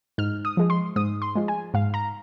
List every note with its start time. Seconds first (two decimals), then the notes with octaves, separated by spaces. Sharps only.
0.18 G#2 F6
0.45 D#6
0.57 F3 G#3
0.70 C6
0.96 G#2 D#6
1.22 C6
1.36 F3 G#3
1.48 G#5
1.74 G#2 F5
1.94 A#5